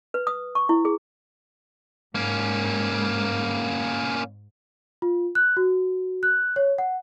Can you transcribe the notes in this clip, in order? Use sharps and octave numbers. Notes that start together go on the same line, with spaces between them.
B4
D#6
C#6
E4
G#4
G#2 A#3 C#4
F4
F#6
F#4
F#6
C#5
F#5